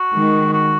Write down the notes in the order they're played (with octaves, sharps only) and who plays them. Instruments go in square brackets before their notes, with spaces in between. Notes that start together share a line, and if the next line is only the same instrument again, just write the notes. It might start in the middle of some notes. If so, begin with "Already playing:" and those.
Already playing: [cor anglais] F#4
[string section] D#3 G#3
[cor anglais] F#4